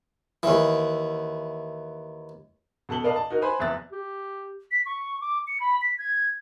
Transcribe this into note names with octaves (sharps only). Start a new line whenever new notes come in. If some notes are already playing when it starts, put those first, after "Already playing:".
D#2 E3
B2 A4 A5 F#7 G7
A#4 B4 D5 D#5 F5 A5
A5
D#4 F#4 A#4
B4 C5 G#5 B5
F1 E2 E5 F#6 A6
G4
B6
C#6
D6
C#7
B5
B6
G#6